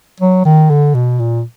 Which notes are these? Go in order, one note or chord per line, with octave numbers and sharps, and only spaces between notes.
F#3
D#3
D3
B2
A#2